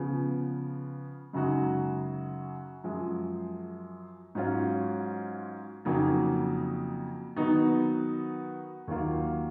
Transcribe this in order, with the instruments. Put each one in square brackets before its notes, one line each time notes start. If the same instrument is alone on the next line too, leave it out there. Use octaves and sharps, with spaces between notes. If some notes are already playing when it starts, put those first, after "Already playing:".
Already playing: [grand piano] C#3 F3 B3
F#2 C#3 G#3 D#4 F#4
F#2 F3 G#3
G#2 F#3 C#4 F4
F2 C#3 F#3 A#3 D#4
D#3 F#3 B3 D#4 F#4
D#2 D#3 F#3 A#3 F4